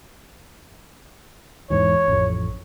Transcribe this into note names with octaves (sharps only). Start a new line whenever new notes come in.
E2 G#2 E3 C#5
A1 F2